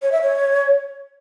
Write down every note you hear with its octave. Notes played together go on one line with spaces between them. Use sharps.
C#5
E5
C#5